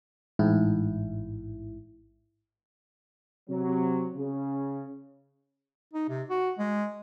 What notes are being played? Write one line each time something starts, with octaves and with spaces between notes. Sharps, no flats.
A1 G#2 E4
C3 F#3
C#3
D#4
C3
F#4
G#3